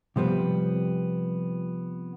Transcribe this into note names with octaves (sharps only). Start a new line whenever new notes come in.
C3 F3 G3 B3 C4